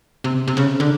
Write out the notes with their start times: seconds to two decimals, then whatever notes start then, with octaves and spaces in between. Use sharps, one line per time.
0.24 C3
0.48 C3
0.57 C#3
0.80 D3